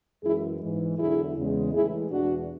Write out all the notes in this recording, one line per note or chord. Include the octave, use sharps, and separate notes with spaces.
F#2 E3 G#3 E4 G#4
G#2 E3 G#3
E2 D3 F#3 E4 G#4
E2 C#3 G#3
A2 E3 G#3 E4 G#4
E2 B2 G#3 D4 F#4